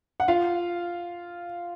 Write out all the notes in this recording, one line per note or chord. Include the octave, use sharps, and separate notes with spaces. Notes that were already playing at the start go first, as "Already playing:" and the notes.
F#5
F4 F5